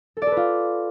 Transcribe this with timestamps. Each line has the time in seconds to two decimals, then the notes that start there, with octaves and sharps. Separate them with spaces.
0.17 A4
0.22 D5
0.27 A4
0.32 B4
0.37 F4